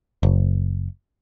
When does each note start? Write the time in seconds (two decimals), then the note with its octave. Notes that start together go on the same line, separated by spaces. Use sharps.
0.23 F#1